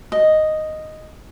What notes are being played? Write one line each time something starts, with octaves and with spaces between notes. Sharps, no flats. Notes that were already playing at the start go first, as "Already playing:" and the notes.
D#5